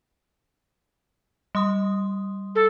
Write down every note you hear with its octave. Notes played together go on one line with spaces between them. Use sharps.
G3 C6 D#6
A4